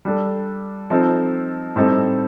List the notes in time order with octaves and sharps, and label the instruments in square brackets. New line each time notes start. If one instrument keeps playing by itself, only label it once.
[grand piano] G3 D4 A4
F3 C4 D#4 A4
A2 G3 C4 D#4 A4